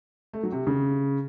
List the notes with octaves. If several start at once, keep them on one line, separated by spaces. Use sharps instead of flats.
A3
F#3
C3
C#3